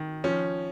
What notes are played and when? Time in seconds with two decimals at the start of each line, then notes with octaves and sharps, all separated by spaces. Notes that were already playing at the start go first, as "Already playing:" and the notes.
Already playing: D#3
0.24 F3 C#4